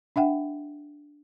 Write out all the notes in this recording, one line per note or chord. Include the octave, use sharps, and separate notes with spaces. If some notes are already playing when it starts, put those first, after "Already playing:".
D4 E5 F#5 G5